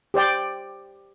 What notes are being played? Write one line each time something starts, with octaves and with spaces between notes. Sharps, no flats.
G4 C5 D5 G5